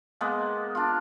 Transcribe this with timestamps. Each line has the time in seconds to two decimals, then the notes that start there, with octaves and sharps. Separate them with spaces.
0.21 G#3 A#3 B3
0.75 D4 F4